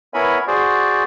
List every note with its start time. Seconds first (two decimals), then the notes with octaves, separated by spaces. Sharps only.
0.14 B3 E4 A#4 C#5 G#5 B5
0.47 F#4 G#4 C5 D5